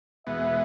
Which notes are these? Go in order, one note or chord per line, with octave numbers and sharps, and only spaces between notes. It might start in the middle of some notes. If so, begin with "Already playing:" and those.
E2 B2 G#3 B3 E5